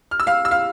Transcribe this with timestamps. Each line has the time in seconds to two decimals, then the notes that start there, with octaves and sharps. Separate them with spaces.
0.11 F6
0.20 E6
0.27 F5 F6
0.45 E6
0.51 F5 F6